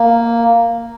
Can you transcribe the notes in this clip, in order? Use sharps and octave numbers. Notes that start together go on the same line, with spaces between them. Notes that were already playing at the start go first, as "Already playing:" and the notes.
Already playing: A#3